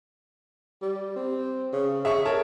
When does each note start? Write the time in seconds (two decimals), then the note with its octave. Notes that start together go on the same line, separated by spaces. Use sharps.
0.82 G3
1.16 C4
1.73 C#3
2.05 G#4 E5 C#6
2.25 A4 A#4 C#5 A5